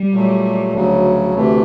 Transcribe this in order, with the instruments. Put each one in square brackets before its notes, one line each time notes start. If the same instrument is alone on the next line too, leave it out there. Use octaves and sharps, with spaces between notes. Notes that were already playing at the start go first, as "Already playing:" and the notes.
Already playing: [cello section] G3
[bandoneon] A#2 F#3 A3
D2 C#3 F#3
D2 C3 E3 A3